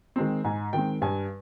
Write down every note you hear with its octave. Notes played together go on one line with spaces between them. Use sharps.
D#3 G#3 C4
G#2 G#5
D#3 G#3 C4 G5
G2 G#5